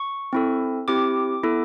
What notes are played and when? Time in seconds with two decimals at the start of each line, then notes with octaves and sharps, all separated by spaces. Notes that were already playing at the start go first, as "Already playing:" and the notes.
Already playing: C#6
0.33 C4 E4 A4
0.88 C4 E4 G4 D6
1.43 B3 E4 A4